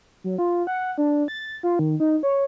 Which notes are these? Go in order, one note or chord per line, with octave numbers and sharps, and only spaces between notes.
F#3
F4
F#5
D4
A6
F4
D#3
D#4
C#5